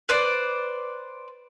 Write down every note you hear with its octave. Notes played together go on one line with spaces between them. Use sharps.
B4 C5 D5